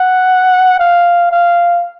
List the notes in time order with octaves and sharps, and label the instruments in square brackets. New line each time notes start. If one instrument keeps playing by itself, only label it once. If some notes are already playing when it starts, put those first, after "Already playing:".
Already playing: [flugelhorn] F#5
F5
F5